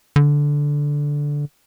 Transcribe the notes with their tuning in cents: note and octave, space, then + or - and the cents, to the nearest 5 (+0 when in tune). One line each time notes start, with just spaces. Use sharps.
D3 -10